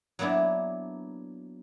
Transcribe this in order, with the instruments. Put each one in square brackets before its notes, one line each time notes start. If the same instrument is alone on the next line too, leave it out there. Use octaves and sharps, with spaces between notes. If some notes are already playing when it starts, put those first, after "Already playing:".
[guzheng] F#3 A#3 B3 D4 E4